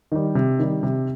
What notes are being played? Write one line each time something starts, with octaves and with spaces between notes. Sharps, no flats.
D#3 G3
C3
D#3 G3
C3